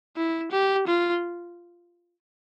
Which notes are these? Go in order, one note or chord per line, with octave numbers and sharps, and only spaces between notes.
E4
G4
F4